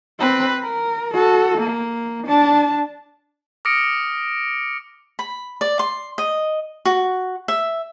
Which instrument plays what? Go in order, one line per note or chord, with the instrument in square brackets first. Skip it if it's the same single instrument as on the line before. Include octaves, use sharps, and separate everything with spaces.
[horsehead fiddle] C4 B4
A#4
F#4 A4
A#3
D4 A5
[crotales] D6 D#6 F6 A#6 C#7 D7
[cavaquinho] B5
D5
C6
D#5
F#4
E5